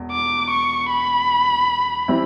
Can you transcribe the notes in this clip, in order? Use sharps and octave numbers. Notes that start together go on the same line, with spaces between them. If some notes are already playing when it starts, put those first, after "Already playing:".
Already playing: E1 E2
D6
C#6
B5
E3 G3 C4 E4